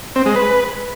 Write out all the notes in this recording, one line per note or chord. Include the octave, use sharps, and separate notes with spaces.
C4
G#3
B4